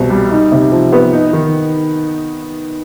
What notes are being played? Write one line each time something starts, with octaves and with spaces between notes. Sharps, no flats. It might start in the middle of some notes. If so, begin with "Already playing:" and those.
Already playing: C2 B2 C4
G3
D#4
C3
F3
B3
D#4
D#3